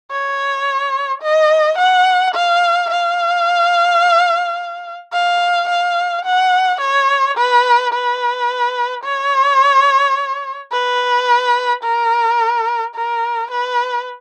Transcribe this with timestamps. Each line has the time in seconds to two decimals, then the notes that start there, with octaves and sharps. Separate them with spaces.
0.11 C#5
1.22 D#5
1.78 F#5
2.34 F5
2.90 F5
5.13 F5
5.69 F5
6.25 F#5
6.81 C#5
7.37 B4
7.93 B4
9.04 C#5
10.72 B4
11.83 A#4
12.95 A#4
13.51 B4